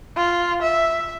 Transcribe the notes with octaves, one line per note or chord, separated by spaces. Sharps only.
F4
E5